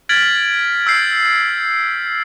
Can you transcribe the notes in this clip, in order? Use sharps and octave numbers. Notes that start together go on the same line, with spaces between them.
F6 G#6 A6 B6 D7 F#7
E6 G6 C7